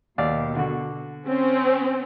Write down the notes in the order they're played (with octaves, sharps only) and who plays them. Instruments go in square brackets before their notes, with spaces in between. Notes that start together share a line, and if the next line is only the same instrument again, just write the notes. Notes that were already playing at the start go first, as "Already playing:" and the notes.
[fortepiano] D#2 D5 F5 [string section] B2
[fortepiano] D3 F#4
[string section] C4 C#4 C5